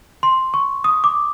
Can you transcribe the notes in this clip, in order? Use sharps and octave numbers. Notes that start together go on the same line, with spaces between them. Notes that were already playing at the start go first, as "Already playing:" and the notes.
C6
C#6
D#6
D6